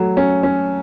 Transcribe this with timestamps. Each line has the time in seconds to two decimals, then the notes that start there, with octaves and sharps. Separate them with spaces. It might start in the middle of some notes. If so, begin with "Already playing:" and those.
Already playing: F#3 A3
0.17 C#4
0.43 C#4